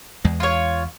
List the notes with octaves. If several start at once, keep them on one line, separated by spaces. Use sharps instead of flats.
E2 G#3
F4 C#5